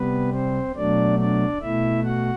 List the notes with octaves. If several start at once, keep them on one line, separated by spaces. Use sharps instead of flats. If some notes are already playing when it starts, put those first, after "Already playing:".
Already playing: C3 G3 B3 B4
C4 C5
B2 F#3 A3 D4 D5
D4 D5
B2 A3 E4 E5
F#4 F#5